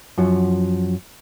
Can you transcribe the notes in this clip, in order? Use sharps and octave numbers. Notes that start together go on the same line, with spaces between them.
F#2 F3 F#3